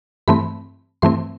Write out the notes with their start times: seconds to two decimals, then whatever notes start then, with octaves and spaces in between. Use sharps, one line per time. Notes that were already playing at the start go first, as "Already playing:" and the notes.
0.28 G2 E3 A3 C4 B5
1.02 G2 E3 A3 C4 C6